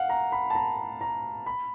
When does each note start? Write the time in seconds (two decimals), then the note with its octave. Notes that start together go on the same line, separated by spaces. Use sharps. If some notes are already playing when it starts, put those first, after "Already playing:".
Already playing: F5 F#5
0.09 A#5
0.32 B5
0.50 A5
0.55 A#5
1.01 A#5
1.46 B5